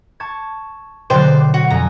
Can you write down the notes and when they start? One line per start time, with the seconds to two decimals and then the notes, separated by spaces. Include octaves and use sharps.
0.20 A5 C#6 G#6
1.10 B2 D3 F#3 C5 D5 G5
1.54 F#4
1.70 F2 G#5 A#5